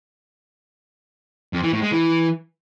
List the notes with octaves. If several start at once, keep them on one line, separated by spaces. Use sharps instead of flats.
F2
E3
A2
G#3
E3